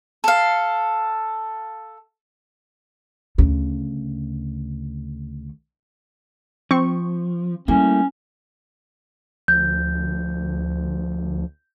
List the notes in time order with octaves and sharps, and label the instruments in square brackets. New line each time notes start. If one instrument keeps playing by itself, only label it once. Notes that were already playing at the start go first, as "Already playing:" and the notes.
[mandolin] A4 F5
[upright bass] D2 C#3
[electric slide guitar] F3 [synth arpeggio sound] C4 C#6
[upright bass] G3 [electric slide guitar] A3 A#3 E4 [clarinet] C#4
[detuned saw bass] D2 [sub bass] F3 [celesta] G6